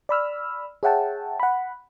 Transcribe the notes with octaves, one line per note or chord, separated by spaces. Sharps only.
D5 B5 E6 F6
G#4 C#5 E5 F#5 G5 A5
F#5 B5